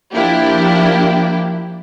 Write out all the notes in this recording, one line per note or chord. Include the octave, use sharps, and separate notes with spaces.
F3 A#3 D4 E4 G4